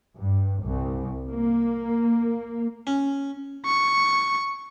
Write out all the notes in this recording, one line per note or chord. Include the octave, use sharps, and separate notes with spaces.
G2
C2
A#3
C#4
C#6